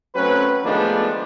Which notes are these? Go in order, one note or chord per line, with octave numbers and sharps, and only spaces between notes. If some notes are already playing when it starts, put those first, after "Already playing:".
F#3 A3 C4 C#4 B4
D#3 F3 G#3 A3 B3 D4